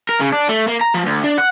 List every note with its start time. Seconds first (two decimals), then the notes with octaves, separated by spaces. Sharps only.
0.09 A#4
0.20 C#3
0.32 D4
0.49 A3
0.68 A#3
0.81 A#5
0.95 F3
1.06 D2
1.24 D4
1.38 F#5